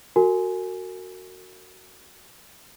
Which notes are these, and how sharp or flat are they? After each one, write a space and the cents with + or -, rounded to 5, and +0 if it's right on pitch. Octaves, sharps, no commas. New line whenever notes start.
F#4 +0 A#4 -35 G#5 +15